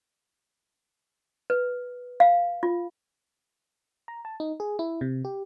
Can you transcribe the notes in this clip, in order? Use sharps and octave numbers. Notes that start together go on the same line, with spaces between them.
B4
F5
F4
A#5
A5
D#4
G#4
E4
C3
G4